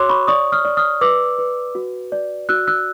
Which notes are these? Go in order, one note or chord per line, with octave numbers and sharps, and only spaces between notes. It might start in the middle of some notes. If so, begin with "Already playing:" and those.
Already playing: F#4 C#5 C6 D6 E6 F#6
B5 C#6
D5 C#6 D#6
D#6 F6
D5
D#6 F6
B4 D6 E6
B4
F#4
D5
F#4 E6 F#6
E6 F#6